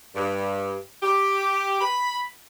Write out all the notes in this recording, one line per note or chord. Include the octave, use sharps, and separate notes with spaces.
G2
G4
B5